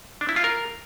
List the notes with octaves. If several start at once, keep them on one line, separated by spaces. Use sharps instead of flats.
D4
E4
F4
A#4